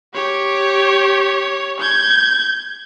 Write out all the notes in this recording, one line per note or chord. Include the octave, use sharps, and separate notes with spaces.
G4 C#5
G6 G#6